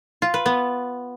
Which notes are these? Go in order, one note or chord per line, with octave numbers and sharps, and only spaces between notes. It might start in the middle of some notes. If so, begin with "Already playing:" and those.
F4
B4
B3